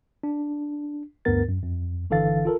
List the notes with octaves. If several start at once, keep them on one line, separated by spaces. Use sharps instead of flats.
D4
D2 G2 B3 A#4 A6
F#2
F2
G1 D3 E3 A4 F5 A6
F4 A4 A#4